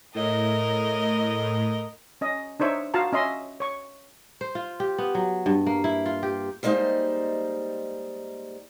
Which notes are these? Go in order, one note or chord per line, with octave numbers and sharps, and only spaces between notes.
A2 A#4 D#5
C#4 D#5
D4 D#4 C5 C#5 E5
F4 F#4 F5 A5 A#5
C#4 D#5 E5 C6
C#5 C#6
C5
F4
G4
B3
F#3
G2
A#3
E4
F4
G4
G3 G#3 A#3 D#4 C5